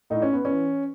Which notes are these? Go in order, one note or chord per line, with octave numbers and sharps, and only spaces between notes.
A2 D#4
C#4
B3
E3 C#4